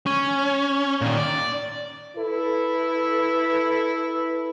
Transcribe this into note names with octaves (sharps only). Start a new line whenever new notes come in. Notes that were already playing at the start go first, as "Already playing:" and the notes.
C#4
A#2 D#3
D5
E4 A4 B4